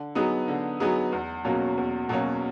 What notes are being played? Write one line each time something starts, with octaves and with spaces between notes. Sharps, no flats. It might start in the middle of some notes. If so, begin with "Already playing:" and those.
Already playing: D3
F#3 B3 D#4 G#4
D3
F#3 B3 D#4 G#4
E2
B2 F#3 A#3 C#4
E2
B2 F#3 A#3 C#4